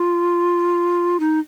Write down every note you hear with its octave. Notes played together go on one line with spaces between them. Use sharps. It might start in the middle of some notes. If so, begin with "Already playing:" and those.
Already playing: F4
D#4